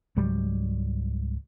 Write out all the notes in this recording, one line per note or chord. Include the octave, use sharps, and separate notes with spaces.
C#2 G#2 F#3 G3